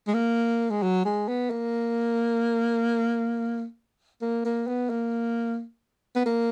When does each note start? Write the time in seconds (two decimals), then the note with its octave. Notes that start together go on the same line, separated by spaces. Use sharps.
0.07 G#3
0.14 A#3
0.70 G#3
0.83 F#3
1.05 G#3
1.28 B3
1.50 A#3
4.22 A#3
4.45 A#3
4.67 B3
4.90 A#3
6.16 B3
6.26 A#3